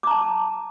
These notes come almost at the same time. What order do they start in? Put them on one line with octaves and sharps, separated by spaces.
D6 A#5 A5